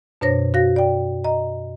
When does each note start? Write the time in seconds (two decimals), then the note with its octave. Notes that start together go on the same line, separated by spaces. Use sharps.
0.21 F#2 B2 D4 C5 C#5 A#6
0.54 F#4 F5 A#6
0.76 D5 G5
1.24 D#5 A#5